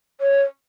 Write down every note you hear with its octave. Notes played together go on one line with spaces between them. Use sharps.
C#5